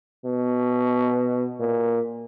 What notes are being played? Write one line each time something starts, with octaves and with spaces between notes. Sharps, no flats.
B2
A#2